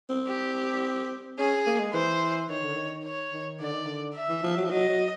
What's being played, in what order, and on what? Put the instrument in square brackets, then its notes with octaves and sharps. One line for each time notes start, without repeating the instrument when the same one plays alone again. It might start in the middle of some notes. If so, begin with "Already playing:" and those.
[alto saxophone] C4
[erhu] G4
[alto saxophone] C#4 [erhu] G#4
[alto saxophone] A#3
G#3
[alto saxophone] E3 [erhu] C5
[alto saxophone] D#3 [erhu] C#5
[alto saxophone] D3
D#3
[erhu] C#5
[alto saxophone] D#3
[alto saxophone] D3 [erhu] D5
[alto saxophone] D#3
D3
[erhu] E5
[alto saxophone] E3
F3
F#3
F3
[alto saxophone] F#3 [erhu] D#5
[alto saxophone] F#3